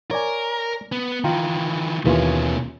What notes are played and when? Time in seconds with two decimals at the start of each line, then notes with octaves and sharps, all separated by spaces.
0.11 A#4 C#5 D5 G#5
0.92 B3
1.24 D#3 E3 F4 G5 A#5
2.06 D#2 B2 E3 C#4 F4